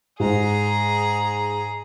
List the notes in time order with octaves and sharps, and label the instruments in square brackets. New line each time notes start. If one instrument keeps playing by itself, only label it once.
[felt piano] G#2 [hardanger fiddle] G#4 A#5